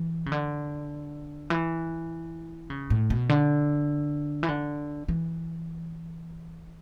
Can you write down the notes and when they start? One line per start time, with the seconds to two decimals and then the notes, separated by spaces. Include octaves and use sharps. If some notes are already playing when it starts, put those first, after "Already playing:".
Already playing: E3
0.26 C#3
0.32 D3
1.50 E3
2.70 C#3
2.90 A2
3.10 B2
3.29 D3
4.43 E3
4.48 D3
5.08 E3